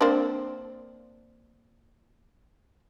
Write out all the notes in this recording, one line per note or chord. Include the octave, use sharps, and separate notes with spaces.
A#3 C4 D4